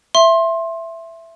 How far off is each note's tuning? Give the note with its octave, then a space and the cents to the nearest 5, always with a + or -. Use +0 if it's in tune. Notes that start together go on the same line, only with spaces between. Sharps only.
E5 +10 C6 +20